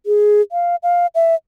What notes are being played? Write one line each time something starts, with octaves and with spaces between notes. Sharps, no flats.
G#4
F5
F5
E5